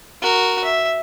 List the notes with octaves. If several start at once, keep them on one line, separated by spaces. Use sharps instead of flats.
F#4 A#4
E5